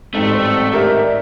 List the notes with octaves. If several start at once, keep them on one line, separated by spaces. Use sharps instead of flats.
A1 G#2 F#3 G3 A3 C4
D#3 G4 A#4 D5 E5